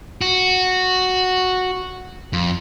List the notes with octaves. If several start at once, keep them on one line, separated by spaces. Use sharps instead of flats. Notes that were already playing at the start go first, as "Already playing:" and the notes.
F#4
F2